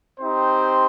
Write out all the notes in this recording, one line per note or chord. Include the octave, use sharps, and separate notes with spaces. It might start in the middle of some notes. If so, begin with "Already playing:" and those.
C4 D#4 G4 C5